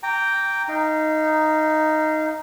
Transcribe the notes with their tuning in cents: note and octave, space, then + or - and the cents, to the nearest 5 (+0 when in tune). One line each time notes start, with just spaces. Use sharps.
G5 +0 A#5 -15 D6 -35
D#4 +0 F5 -25